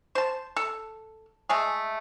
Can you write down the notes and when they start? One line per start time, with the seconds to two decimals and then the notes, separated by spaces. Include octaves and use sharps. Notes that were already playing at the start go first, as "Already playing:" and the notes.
0.15 C5 A5
0.56 A4
1.49 G#3 A3 G#4